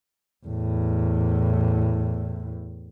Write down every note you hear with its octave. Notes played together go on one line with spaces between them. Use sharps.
E2 A2